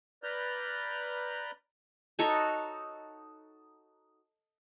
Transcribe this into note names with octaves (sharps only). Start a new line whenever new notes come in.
B4 D5 A#5 F6 G6
D#4 F#4 A4 C#5